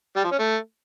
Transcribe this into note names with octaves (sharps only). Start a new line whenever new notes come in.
G3
F3
C#4
A3